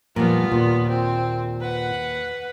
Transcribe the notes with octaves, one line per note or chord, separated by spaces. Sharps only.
A#2 F3 G3 B3 F4 A#4
D#2 A#2
C4
B4 F#5